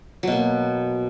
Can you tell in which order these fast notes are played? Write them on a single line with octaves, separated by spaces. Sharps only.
F#3 B2 A#3